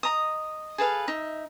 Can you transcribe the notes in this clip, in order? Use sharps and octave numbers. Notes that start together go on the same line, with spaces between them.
D#5 A#5 D#6
G#4 A4 B4 F5
D#4 E5